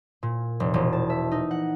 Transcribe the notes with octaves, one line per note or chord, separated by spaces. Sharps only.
A#2
F1
E1
A5
E5
D#4
F#5